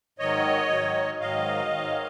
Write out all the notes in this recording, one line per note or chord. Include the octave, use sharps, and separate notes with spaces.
G#2 D#3 F#3 C#5 D#5
G#2 D#3 F#3
G#2 D#3 F#3 D#5 F5
G#2 D#3 F#3